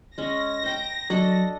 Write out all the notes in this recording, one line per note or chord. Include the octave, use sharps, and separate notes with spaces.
G#3 C#4 A#6
C5 G5 A#5
F#3 D4 A4 D#5